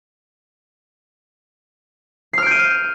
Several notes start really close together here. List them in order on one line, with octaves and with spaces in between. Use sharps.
C7 F6 D7 G6 D#7